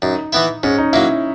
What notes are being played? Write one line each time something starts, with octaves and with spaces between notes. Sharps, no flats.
F#2 D#4
E3 B3 E4
G#2 C#4
D#4
F#3 A#3 E4